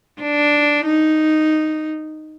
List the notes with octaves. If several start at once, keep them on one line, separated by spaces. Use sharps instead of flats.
D4
D#4